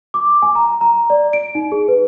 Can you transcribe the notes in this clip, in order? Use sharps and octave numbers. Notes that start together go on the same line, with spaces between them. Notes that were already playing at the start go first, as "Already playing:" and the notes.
D6
G#5
A#5
A#5
D5
D7
D#4
G#4
B4